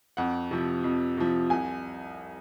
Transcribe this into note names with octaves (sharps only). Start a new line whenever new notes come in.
F2 F#5
C3 F3
F2
C3 F3
C2 G#5